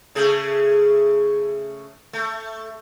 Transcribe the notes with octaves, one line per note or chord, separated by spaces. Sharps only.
C#3 A3 G#4
A3